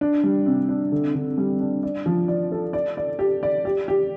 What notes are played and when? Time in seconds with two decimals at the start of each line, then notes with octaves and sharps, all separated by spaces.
0.01 D4
0.24 G3
0.46 C3
0.69 D4
0.92 D3
1.15 D3
1.38 G3
1.60 D4
1.83 D5
2.06 F3
2.28 D5
2.52 A4
2.73 D5
2.97 D5
3.19 G4
3.43 D5
3.65 G4
3.88 G4